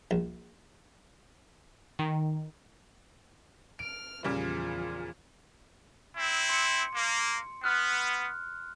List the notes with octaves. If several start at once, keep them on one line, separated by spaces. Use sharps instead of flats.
A#1
D#3
F6 D7
E2 A#2 C#3 F3 G3 G#4
C4 E4
C6 C#7
A#3
B3 F6 F#6